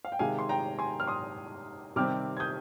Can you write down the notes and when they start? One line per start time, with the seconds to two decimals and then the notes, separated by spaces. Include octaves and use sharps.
0.05 F5
0.12 G5
0.19 C3 D#3 G#3 F5 G#5
0.39 C6
0.49 G5 A#5
0.79 G#5 C6
1.00 F6
1.07 C6 D#6
1.96 C3 D#3 G3 C4 D6 F6
2.37 G#6
2.40 D#6 G6